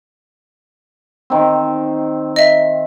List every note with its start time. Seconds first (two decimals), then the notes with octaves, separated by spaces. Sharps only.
1.30 D#3 C4
2.36 D#5 E5